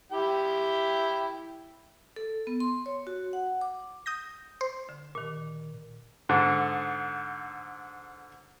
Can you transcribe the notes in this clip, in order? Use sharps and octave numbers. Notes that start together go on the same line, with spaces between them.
E4 G4 G5
A4
B3
C6
C#5
F#4
F#5
D6
D#6 G6 A#6
C5
D3
A#2 D#3
G#2 D3